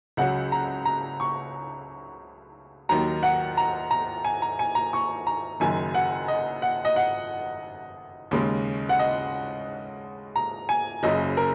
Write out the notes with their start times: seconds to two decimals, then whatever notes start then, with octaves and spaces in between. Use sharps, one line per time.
0.17 C#2 C#3 F#3 F#5
0.52 A#5
0.85 A#5
1.20 C#6
2.89 D#2 D#3 F#3 A#5
3.23 F#5
3.57 A#5
3.91 A#5
4.25 G#5
4.42 A#5
4.59 G#5
4.75 A#5
4.93 C#6
5.27 A#5
5.60 F#1 F#2 D#3 G#5
5.95 F#5
6.28 D#5
6.62 F#5
6.85 D#5
6.96 F#5
8.31 D#2 C#3 G#3
8.89 F#5
8.99 D#5
10.36 A#5
10.69 G#5
11.03 F#1 F#2 C#3 D#5
11.37 A#4